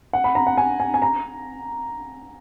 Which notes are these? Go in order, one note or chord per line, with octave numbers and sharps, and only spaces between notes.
F#5
B5
A#5
F#5
G#5
G#5
G#5
A#5